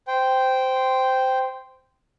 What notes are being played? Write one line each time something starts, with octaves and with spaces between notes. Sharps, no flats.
C5 G5